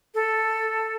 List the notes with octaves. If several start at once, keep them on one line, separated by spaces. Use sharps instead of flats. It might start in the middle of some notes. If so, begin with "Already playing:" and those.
A4